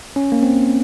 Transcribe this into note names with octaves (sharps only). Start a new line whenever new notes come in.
C#4
A#3
C4